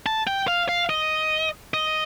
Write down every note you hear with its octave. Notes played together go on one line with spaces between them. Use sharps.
A5
G5
F5
F5
D#5
D#5